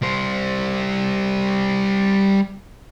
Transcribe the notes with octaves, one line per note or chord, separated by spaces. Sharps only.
G3 C5